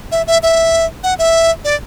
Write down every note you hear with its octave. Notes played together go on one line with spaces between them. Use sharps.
E5
E5
E5
F#5
E5
D5